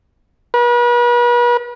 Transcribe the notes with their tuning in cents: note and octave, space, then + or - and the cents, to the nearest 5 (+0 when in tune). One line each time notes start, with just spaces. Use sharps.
B4 -40